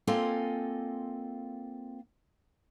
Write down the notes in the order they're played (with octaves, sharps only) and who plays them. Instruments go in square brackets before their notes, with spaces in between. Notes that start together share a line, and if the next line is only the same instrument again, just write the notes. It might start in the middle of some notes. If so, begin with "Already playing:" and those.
[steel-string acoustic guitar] A#3 C4 F4 A4 D#5 G#5